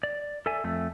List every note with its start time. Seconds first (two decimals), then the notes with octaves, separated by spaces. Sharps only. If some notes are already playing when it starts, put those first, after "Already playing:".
0.03 D5
0.46 A4 D5 E5 G#5
0.64 F2 A3